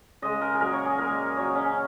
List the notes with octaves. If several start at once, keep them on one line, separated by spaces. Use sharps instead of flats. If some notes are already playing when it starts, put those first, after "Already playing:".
C#3 G#3 D#5
A#4
G#4
A#2 F#3 A#4
C#5
G#4
A#2 G#3 A#4
A#2 F#3 C#5
C#4